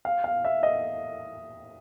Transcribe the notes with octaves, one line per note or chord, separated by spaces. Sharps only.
F5
F5
E5
D#5